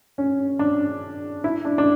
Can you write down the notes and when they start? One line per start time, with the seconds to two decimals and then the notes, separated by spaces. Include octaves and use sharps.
0.18 C#4
0.59 D4
1.44 E4
1.65 D4
1.78 D4